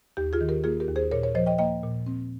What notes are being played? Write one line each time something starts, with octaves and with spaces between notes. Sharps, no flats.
D#2 G4
F4 G#4
D#3
G4 A#4
A#3 F4 G#4
G4 A#4
D#2
G#4 C5
A#2 A#4 C#5
A#4 C#5
F3 C5 D#5
D#5 G5
A#3 D#5 G5
A#2
C4